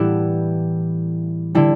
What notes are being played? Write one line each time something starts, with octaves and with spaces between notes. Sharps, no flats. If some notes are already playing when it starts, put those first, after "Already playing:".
Already playing: A2 E3 G3 B3 E4 G4
D3 G3 E4